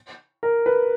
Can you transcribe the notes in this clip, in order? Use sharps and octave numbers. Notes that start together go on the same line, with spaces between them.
A#4
B4